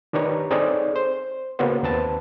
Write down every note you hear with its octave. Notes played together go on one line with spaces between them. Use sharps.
D#3 D4 G4 B4 C#5 A#5
C4 D#4 G#4 A4 C#5 D5
C5
C#3 A#3 B3 C#4 F#4 C5
D#2 C4 B4 A5